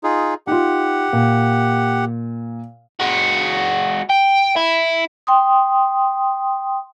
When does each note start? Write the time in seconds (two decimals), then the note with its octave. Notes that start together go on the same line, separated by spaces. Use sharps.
0.04 D#4 F4 G#4
0.47 D#4 F4 G4 F#5
1.13 A#2
3.00 G#3 F#4
4.09 G5
4.57 E4
5.27 G5 C6 D#6